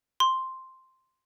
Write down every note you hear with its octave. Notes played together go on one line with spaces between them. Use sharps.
C6